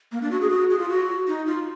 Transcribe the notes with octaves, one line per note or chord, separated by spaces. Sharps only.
A#3
D4
F#4
G#4
F#4
G#4
F4
F#4
D#4
F4